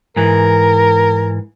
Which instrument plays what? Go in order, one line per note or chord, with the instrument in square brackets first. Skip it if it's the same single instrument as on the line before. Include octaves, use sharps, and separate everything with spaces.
[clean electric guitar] G#2 E3 [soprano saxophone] A#4